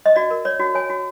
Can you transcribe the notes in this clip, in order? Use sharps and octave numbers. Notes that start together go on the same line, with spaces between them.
D#5
F#4 D5
A#4
C#5 D5
F#4
C#5 G#5
F#4